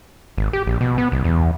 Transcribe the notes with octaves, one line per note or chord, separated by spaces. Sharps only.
G#1
G4
A#1
B2
B3
C2
E2